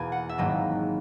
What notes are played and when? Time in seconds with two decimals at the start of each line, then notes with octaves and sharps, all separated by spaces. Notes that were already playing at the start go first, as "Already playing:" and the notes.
Already playing: E2 B2 A#3 G#5
0.12 F#5
0.29 E5
0.38 G#1 G#2 F#3 A#3 D#5